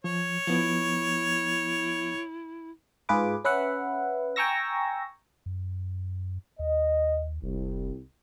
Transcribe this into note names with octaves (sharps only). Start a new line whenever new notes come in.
F3 C#5
F3 B3 E4
G#2 F4 G#4 B4 D6
C#4 B4 E5 F#5
G5 G#5 A#5 C#6 E6 A#6
F#2
D#2 D#5
F1 C2